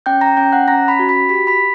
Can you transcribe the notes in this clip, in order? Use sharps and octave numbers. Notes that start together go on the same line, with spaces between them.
C#4 G5 G6
A#5 A#6
C#4 G5 G6
F#5 F#6
C#4 A#5 A#6
B5 B6
F#4
B5 B6
G4 B6
B5 B6